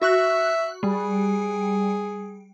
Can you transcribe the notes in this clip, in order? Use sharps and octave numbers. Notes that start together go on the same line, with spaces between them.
F#4 E5 C#6 F#6
G3 G#4